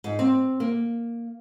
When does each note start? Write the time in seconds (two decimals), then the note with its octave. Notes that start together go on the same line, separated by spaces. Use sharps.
0.04 G#2
0.19 C4
0.60 A#3